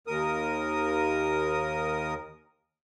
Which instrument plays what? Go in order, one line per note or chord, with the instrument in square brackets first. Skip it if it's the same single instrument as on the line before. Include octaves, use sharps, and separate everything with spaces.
[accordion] D#2 A#4 D#6